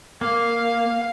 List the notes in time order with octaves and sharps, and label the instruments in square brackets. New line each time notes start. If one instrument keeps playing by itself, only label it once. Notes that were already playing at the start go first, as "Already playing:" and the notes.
[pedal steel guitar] A#3 [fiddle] F5